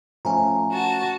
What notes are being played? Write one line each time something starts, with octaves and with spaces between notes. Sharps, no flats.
F3 A3 C#4 G#5 A#5
F#4 A5